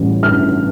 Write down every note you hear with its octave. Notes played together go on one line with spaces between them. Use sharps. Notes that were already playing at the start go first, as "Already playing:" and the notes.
Already playing: A1 G3
G2 F6